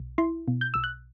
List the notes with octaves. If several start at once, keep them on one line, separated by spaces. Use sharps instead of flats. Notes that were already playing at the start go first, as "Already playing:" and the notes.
Already playing: B1
E4 C6
B2
G6
B1 E6
F#6